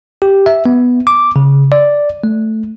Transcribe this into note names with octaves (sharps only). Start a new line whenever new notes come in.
G4
E5
B3
D6
C#3
D5
A3